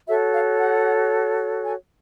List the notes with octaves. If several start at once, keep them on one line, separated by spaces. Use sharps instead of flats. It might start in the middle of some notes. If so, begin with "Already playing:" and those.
F#4 A4 C#5 E5
F5
F#5
G#5